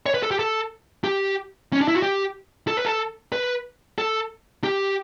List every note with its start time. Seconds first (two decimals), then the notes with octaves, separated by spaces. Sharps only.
0.06 C#5
0.14 B4
0.22 A4
0.31 G4
0.39 A4
1.04 G4
1.73 C#4
1.81 D4
1.88 E4
1.95 F#4
2.03 G4
2.67 A4
2.77 B4
2.86 A4
3.32 B4
3.98 A4
4.64 G4